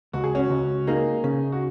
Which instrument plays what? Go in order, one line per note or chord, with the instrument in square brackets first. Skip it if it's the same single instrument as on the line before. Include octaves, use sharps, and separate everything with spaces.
[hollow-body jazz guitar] C#2 [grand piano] F#4
[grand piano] G#4
C#4 F#4
[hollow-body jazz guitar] C#2
[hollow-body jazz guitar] A#3 [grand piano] D#4 G#4
[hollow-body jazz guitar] C#3
[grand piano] F#4